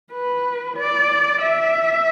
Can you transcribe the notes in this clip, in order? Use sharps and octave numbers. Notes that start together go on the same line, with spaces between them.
B4
D5
E5